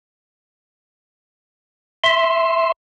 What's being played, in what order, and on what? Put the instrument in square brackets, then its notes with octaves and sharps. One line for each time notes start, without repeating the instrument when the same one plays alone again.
[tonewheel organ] E5 C6